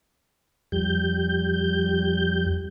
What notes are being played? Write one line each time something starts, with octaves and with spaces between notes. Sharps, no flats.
F2 G3 G6